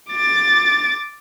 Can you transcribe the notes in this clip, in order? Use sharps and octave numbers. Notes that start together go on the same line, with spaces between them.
D6 A6